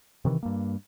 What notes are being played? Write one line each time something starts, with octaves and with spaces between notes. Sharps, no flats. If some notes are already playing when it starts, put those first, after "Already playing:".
C3 D#3 E3
G2 A#3